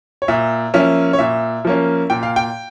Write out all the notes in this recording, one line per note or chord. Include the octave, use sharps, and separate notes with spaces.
C#5
A#2 E5
F3 A#3 C#4 E5
C#5
A#2 E5
F3 A#3 C#4
A#2 G5
F5
G5